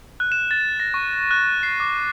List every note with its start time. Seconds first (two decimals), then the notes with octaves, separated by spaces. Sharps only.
0.20 F#6
0.32 E7
0.51 A6
0.80 A#6
0.94 C#6
1.31 F#6
1.63 C7
1.80 D6